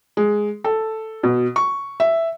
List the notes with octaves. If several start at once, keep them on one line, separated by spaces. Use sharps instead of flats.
G#3
A4
B2
C#6
E5